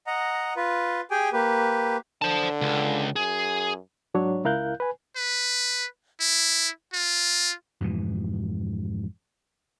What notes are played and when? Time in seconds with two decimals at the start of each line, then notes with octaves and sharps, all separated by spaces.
0.07 D#5 F#5 A#5
0.56 F4 B4
1.11 G4 G#4 G5 G#5
1.33 A#3 G4 B4
2.22 D3 C5 A5
2.61 C#2
3.16 F#2 G#4
4.14 G#2 F#3 D4 C#5
4.44 C#2 E4 A#4 F5 F#6 G6
4.80 B4 G#5
5.16 B4
6.21 E4
6.93 F4
7.81 F2 G#2 B2 E3